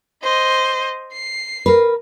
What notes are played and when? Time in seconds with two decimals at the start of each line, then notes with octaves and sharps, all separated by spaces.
0.23 C5 D#5
1.13 C7
1.66 A#4 B4